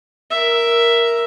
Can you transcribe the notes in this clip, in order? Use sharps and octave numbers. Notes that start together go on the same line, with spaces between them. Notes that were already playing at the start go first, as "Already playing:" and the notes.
A#4 E5